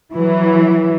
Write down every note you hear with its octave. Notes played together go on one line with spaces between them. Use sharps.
E3 F#3